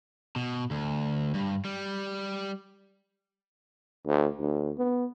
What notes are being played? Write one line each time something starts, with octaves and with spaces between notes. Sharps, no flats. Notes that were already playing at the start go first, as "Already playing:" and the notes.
B2
D2
G2
G3
D2
D2
B3